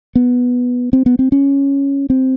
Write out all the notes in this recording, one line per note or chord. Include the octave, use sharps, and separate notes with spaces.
B3
C4
B3
C4
C#4
C4